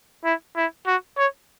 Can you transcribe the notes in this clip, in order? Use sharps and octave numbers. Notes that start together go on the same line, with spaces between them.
E4
E4
F#4
C#5